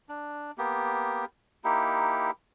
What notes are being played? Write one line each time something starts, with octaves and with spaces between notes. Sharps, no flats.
D4
A#3 B3 G4
A#3 D#4 E4 G4